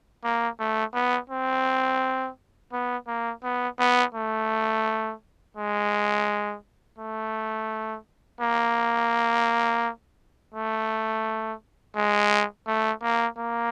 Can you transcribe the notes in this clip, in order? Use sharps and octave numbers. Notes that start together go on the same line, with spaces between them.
A#3
A3
B3
C4
B3
A#3
B3
B3
A3
G#3
A3
A#3
A3
G#3
A3
A#3
A#3